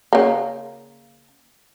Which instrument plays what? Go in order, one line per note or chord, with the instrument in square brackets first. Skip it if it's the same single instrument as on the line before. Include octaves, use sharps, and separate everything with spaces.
[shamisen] C#3 A#3